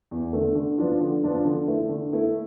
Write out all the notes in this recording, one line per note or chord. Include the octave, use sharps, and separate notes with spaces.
E2
D3 A3
D3
F3 B3 D4 F4
D3
F3 B3 D4 F4
D3
A3 E4
D3
A3 E4